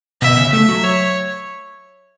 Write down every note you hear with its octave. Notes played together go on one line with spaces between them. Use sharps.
B2 E5
C#3
A3 E5
F#3
C#5